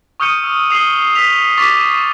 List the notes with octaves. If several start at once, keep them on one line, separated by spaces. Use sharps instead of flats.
C#6 D#6 F6 G6 C#7 D#7
E6
D#6 C7 F#7 G7
E6 B6 F7
C#6 D6 A6 B6 F7